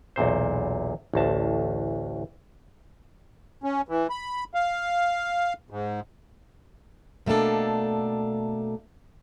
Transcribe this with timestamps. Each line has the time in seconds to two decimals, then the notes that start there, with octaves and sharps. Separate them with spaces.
0.16 B1 E2 A#2 C5
1.14 A1 D2 A5
3.64 C#4
3.88 E3
4.10 B5
4.54 F5
5.70 G#2
7.26 B2 A3 A#3 D4 A4